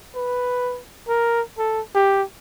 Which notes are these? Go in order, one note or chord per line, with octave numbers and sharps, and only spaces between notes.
B4
A#4
A4
G4